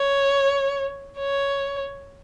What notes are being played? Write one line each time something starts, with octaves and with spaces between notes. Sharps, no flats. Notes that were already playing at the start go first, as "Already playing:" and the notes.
Already playing: C#5
C#5